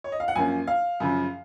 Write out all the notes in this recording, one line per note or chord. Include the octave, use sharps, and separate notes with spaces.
C#5
D#5
F5
F#5
F#2 F3 A#3 C#4 G#5
F5
F#2 C#3 F3